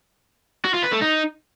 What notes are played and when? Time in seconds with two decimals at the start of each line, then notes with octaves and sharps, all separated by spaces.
0.65 F#4
0.74 F4
0.83 B4
0.92 A3
1.01 D#4